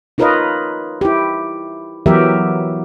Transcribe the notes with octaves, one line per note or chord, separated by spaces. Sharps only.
D#4 F4 A#4 B4 C#5 D#5
E4 G4
E3 F#3 B3 G4 A#4 E5